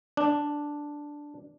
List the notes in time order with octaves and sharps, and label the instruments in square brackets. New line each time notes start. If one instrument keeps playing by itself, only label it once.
[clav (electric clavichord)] D4